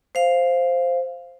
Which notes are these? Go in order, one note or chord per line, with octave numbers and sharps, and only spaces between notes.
C5 F5